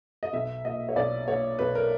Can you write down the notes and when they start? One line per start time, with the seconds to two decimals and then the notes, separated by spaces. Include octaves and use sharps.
0.23 D#5
0.33 B1 E5
0.65 A#2 D#5
0.89 C#5
0.96 B1 D5
1.27 A#2 C#5
1.59 B1 B4
1.75 A#4